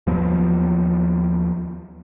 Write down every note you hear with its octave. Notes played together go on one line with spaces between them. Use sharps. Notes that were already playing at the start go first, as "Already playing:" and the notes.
D#2 F3 F#3 B3